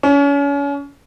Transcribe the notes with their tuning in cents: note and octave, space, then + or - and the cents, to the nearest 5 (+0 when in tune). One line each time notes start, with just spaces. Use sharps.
C#4 +35